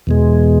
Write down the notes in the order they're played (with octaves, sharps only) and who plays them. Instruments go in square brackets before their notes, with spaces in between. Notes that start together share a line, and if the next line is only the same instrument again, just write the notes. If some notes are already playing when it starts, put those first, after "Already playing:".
[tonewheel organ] E2 B2 G#3